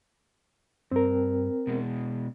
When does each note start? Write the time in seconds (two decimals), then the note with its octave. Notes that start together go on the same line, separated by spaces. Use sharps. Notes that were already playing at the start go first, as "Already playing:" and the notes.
0.91 G2 C4 A#4
1.67 B2 G#3